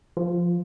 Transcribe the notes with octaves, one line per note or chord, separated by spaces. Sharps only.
F3